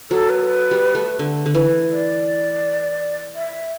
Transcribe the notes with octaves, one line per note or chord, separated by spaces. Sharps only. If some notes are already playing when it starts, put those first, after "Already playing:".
F#3 A4
B4
G3
A3
D3
D3
E3
D5
E5